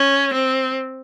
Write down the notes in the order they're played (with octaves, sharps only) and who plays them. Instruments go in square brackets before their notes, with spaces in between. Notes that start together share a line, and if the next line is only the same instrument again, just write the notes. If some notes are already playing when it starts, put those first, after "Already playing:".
Already playing: [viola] C#4
C4